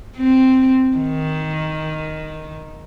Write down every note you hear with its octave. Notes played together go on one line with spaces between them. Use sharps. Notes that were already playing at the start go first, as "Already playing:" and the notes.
C4
D#3